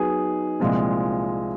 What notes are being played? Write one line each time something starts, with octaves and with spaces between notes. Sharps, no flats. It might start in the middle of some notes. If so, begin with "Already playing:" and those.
Already playing: F#3 B3 D#4 G#4
C2 A#2 F3 G#3 C4